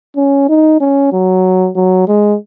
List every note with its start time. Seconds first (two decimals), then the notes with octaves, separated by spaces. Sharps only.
0.17 C#4
0.49 D#4
0.81 C#4
1.12 F#3
1.76 F#3
2.08 G#3